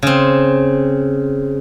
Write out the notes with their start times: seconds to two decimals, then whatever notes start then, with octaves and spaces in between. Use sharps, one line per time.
0.03 C#3 C4